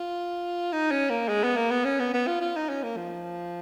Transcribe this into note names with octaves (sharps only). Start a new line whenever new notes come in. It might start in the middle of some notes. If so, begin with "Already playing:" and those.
Already playing: F4
D#4
C#4
A#3
G#3
B3
A#3
B3
C#4
B3
B3
F4
F4
D#4
C#4
A#3
F3